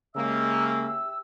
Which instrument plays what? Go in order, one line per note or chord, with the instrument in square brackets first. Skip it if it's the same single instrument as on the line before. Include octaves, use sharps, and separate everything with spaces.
[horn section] C#3 G#3 A#3 [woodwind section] G4 E5 E6